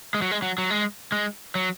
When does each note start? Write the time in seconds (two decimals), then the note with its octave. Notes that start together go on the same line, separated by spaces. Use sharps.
0.14 G#3
0.22 F#3
0.31 G#3
0.42 F#3
0.58 F#3
0.70 G#3
1.12 G#3
1.55 F#3